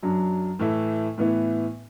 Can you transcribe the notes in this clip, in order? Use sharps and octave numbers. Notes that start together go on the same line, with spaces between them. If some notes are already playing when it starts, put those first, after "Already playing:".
F#2 F#3 D4
A2 E3 A3 E4
A2 E3 B3 E4